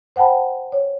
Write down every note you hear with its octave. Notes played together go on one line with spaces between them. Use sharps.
C5 F#5 G5 A5 B5
C#5